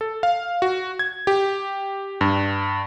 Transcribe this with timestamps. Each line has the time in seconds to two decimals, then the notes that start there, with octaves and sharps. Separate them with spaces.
0.01 A4
0.23 F5
0.62 F#4
0.99 G#6
1.27 G4
2.21 G2